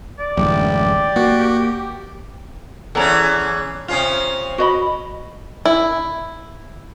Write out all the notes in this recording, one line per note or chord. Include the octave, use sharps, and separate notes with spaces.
D5
A1 F#2 D3 G#3 G4
A#3 F#4
E2 E3 C#4 A4 D5 A#5
C3 C#4 F4
F#4 D#5 B5
E4